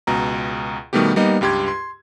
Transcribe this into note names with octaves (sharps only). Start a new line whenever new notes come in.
C#2 B2 A#5
B2 D#3 G3 A3 B3 G4
G3 A#3 B3 D#4 D#5
C#2 G2 G4 C6 G#6
C6